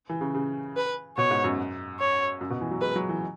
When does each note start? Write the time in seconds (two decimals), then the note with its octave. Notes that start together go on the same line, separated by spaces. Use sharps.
0.09 E3
0.21 C#3
0.35 C#3
0.76 B4
1.16 B2 C#5
1.31 G#2
1.44 F#2
1.99 C#5
2.41 F#2
2.50 B2
2.61 E3
2.71 F#3
2.81 G#3 B4
2.96 F#3
3.09 E3